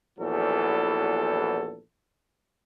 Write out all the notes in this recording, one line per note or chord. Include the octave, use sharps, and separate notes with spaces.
A#1 E2 E3 F#3 A4